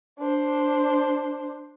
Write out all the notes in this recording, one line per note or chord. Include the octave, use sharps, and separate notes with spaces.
D4 C5